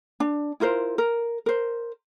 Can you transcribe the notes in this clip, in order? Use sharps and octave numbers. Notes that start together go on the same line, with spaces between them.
D4
E4 F4 A#4 C5
A#4
A#4 C5